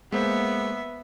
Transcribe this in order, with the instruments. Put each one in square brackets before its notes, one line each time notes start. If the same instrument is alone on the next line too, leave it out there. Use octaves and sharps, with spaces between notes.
[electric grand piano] G#3 A#3 C5 [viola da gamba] B3 [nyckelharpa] E5